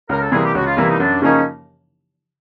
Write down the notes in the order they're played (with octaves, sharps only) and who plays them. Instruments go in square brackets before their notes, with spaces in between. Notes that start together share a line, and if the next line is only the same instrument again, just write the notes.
[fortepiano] C#2 [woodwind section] A#4
[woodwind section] A4
[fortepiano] C3 E3 G3 A#3 [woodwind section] G#4
[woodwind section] G4
[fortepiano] C#2 [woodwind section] F#4
[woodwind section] F4
[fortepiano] C3 E3 G3 A#3 [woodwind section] E4
[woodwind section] D#4
[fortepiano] F#2 [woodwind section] D4
[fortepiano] C#3 F3 A#3 D#4 [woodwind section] C#4